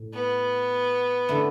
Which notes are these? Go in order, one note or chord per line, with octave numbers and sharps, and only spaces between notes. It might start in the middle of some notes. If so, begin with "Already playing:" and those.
Already playing: A2
B3
D3 A3 E4